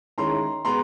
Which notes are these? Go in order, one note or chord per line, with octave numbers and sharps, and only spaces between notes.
D#3 G#3 C#4 E4 A#5 C6
B2 G#3 B3 A#5 C6